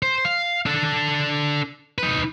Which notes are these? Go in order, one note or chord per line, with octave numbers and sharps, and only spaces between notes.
C5
F5
D4 A4
D#4 B4